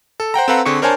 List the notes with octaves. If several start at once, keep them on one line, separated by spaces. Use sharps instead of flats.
A4
C5 F#5 G5 A#5
C4 A4 B4 F5 F#5 A#5
D3 C4 G#4 C#6 C#7
D4 A#4 C5 C#5 G#5 A5